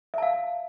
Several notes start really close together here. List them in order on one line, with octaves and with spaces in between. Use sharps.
E5 A5 F5